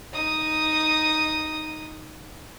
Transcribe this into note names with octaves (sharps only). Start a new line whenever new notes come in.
D#4 D#6